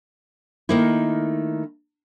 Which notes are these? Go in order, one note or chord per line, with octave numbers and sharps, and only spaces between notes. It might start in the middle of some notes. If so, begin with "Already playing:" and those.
D#3 A3 A#3 D#4 E4